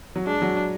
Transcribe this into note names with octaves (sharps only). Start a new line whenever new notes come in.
F#3
G#3 D4
F#3